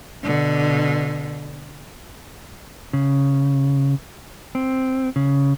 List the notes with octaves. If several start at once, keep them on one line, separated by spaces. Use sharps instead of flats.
B2 D3
C#3
C4
C#3